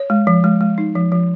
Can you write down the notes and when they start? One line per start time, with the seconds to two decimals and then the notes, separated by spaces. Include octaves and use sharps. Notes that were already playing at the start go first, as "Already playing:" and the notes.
Already playing: C#5
0.10 G#3
0.27 F3
0.44 G#3
0.61 G#3
0.78 D#4
0.95 F3
1.12 F3